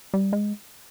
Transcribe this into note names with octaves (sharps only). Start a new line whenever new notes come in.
G3
G#3